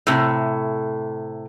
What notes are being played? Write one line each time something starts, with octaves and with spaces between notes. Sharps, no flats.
A2 C3